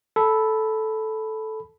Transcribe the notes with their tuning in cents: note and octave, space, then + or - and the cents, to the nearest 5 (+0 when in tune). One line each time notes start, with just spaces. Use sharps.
A4 -10 B5 +0